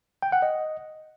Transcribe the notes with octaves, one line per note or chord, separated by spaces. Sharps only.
G5
F#5
D#5